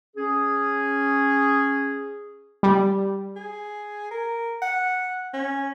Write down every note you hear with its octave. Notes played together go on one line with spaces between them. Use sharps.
C#4 G#4
G3
G#4
A#4
F#5
C#4